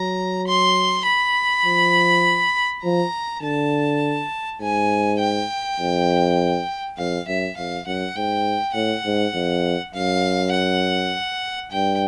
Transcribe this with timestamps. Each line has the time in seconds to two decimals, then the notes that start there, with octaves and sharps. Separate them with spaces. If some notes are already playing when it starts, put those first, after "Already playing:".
Already playing: F#3 A#5
0.47 C6
1.06 B5
1.65 F3
2.84 F3 A#5
3.43 D3 A5
4.61 G#2 G#5
5.21 G5
5.79 F2
6.98 F2 F5
7.28 F#2 E5
7.57 F2 F5
7.87 F#2 F#5
8.16 G#2 G5
8.75 A2 F#5
9.05 G#2
9.35 F2
9.94 F#2 F5
10.53 F#5
11.71 G2 G5